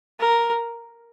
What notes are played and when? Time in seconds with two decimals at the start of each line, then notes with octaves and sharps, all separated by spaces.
0.20 A#4